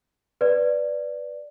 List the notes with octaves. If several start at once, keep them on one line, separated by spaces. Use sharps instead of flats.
B4 D5